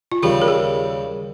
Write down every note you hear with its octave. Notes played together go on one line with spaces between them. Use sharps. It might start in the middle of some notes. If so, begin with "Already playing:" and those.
F4
D#2 C#3 G3 G4
A#4
G#4